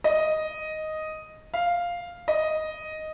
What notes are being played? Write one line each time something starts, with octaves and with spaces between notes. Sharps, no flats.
D#5
F5
D#5